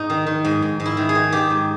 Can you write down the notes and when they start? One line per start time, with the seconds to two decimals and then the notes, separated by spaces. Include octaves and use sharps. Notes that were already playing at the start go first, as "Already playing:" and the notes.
Already playing: G#2 D#4
0.10 D#3
0.26 D#3
0.44 G#2
0.62 G#2
0.80 G#2
0.85 E4
0.97 D#3
1.09 G#4
1.15 D#3
1.32 D#3 G4
1.50 G#2